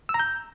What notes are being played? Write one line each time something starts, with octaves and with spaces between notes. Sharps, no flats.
E6
A#5
G6